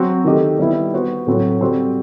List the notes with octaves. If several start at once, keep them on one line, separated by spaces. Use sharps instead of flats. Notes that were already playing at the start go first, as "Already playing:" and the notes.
Already playing: F#3 C4 F#4
D#3 A3 D#4 G4 D#5
D#3 G3 B3 E4
B3 F#4 C5
A2 F#3 A3 C4 F#4
G3 C4 F#4 A4 C5